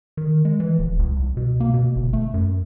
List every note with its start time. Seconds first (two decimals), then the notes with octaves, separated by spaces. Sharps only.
0.17 D#3
0.45 G#3
0.60 E3
0.79 D#1
0.99 C#2
1.17 C2
1.37 B2
1.60 A#3
1.74 B2
1.96 G1
2.13 A3
2.34 F#2